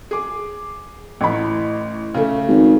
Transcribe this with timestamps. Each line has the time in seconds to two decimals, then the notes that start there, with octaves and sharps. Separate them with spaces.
0.11 G#4 D6
1.21 A1 A2 B5
2.14 C#3 A3
2.48 G#1